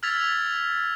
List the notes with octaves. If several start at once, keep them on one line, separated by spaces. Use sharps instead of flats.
E6 F6 G#6 A6 B6 F7